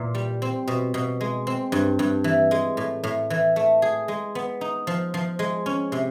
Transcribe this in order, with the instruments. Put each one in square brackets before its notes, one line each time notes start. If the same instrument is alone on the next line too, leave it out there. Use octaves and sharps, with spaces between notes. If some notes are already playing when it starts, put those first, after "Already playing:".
Already playing: [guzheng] A#2 E3
G3
C4
B2
B2
G#3
C4
G2
G2
E3
G#3
A2
A2
E3
A3
G#4
G#3
B3
D#4
F3
F3
G#3
C#4
C3